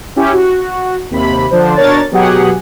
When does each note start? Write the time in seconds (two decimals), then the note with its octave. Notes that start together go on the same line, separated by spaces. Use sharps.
0.16 C#4 E4 G4
0.32 F#4
1.11 D#2 C3 B5
1.51 D3 F3 D4 C5
1.76 B2 D4 A#4 C#5 A6
2.11 B2 F#3 G4 G#4 F#5